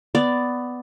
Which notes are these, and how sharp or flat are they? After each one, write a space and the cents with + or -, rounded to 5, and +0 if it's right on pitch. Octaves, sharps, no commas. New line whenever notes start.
B3 +10 D5 +0